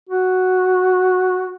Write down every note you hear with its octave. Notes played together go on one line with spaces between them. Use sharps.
F#4